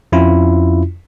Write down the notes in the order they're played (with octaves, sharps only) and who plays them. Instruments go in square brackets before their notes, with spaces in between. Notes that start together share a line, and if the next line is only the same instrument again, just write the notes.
[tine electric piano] F2 C#4 E4 F4